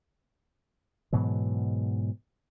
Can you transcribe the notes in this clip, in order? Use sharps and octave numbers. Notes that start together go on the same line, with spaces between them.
G#2 B2 E3 F#3